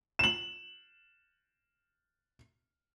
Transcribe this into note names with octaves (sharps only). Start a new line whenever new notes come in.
E7 F#7